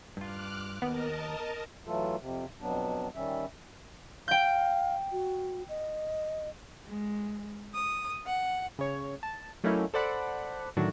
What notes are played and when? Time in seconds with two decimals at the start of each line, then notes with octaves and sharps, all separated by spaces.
0.17 G2 F4 D6 F6 F#6
0.82 D#2 B3 A#4 D#5 A5
1.87 E3 F#3 A3 F4 A4
2.20 F2 C3
2.61 F2 B2 F#3 B3 D4
3.15 D#3 G3 C#4 E5
4.28 F5 G5 G6
5.12 F#4
5.69 D#5
6.86 G#3
7.73 D#6
8.26 F#5
8.79 C#3 C#5
9.23 A5
9.64 F#3 A3 A#3 C#4 D#4 E4
9.94 A4 C5 D5 F#5 B5
10.77 A2 D3 D#3 F#3 D4 F#4